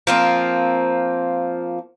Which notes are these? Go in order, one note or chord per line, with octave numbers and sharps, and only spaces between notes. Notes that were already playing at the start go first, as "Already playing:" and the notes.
F3 A#3 C4